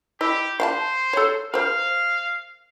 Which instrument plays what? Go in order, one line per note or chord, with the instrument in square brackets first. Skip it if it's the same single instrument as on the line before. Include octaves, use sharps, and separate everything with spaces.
[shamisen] E4 D#5 [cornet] G4
[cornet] C5 [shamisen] F5 G5 A5
[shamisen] A4 C#5
[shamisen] A#4 C5 [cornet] F5